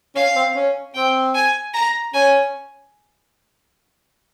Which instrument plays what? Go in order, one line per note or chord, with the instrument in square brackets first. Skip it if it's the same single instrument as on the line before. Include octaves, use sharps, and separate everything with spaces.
[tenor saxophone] C#4 [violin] F5
[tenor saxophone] C4
C#4
[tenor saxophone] C4 [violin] G5
[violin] G#5
A#5
[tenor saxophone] C#4 [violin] G#5